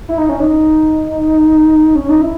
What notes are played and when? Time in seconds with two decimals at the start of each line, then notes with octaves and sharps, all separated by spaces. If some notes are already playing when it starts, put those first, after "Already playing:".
0.09 E4
0.18 D#4
0.29 C#4
0.40 D#4
1.95 C#4
2.09 D#4
2.21 E4